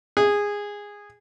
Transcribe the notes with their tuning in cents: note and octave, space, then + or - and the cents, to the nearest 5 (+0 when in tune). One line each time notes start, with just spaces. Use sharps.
G#4 -15